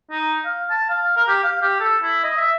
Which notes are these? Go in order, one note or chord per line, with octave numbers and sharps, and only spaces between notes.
D#4
F5
A5
F5
A#4
G4
F5
G4
A4
E4
D#5
E5